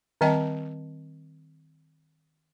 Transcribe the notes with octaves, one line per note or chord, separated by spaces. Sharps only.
D#3 G3 C4 D#5 G5 A5